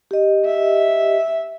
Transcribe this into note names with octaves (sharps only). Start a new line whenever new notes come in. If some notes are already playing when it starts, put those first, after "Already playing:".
G4 D#5
E5